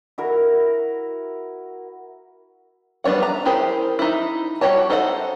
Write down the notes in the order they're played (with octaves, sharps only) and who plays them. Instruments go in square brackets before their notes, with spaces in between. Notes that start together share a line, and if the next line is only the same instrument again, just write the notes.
[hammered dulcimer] E4 F#4 A#4
[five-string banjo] G3 B3 D4 C#5 F#5
A#5
E4 G4 G#4 A#4 C5
D#4 E4
G3 F#4 G4 C#5 A5
D#4 A4 C5 F5 F#5